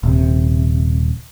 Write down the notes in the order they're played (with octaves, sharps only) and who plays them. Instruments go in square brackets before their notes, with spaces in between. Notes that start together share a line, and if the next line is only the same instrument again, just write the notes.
[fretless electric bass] D#1 C3